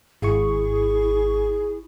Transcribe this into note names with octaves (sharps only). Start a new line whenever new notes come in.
G#1 E4 G#4 C#6